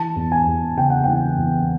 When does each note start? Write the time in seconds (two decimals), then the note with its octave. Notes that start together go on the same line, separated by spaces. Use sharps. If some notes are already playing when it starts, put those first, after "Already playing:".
Already playing: E3 A5
0.16 E2
0.32 G#5
0.47 E2
0.77 C#3 G5
0.90 F#5
1.04 E3 G5
1.38 E2